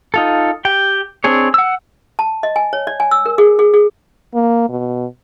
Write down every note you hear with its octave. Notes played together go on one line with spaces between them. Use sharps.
D#4 F4 A4
G4 G5
C4 D4 G#4 C#5
F#5 E6
A5
D#5
G#5
C#5
D5
G#5
E6
A#4
G#4
G#4
G#4
A#3
B2